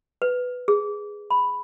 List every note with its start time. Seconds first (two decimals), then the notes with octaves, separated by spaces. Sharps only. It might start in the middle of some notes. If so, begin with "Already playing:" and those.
0.22 B4
0.68 G#4
1.31 B5